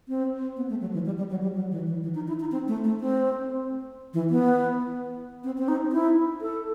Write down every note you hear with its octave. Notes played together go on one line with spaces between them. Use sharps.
C4
B3
A3
F#3
E3
G3
G3
F#3
G3
F#3
E3
E3
E3
D#4
E4
D#4
C4
A3
A3
C4
E3
B3
C4
C4
D#4
E4
A4